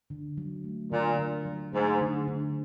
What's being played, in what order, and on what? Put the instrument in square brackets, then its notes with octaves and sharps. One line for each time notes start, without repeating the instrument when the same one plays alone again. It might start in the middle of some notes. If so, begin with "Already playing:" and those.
[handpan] D3
F#3
A3
[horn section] A#2 [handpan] D3
[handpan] D3
F#3
[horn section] G#2 [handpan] A3
[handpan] D3
D3